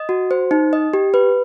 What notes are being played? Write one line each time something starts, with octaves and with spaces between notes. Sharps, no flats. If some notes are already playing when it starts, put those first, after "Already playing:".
Already playing: D#5
F#4
C5
D#4
D#5
G4
B4